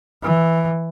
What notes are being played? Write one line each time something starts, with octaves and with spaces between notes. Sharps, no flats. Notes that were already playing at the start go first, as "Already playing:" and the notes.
E3